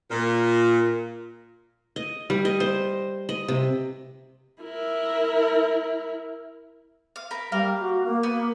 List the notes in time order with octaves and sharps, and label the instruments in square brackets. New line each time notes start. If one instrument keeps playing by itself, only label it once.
[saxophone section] A#2
[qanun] D#5
G3
D#5
C5
D#5
C3
[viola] E4 A#4
[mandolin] F5
A#4 B5
[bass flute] G3 [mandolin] A#3 A#4 F5
[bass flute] F#4
A#3
[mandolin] B3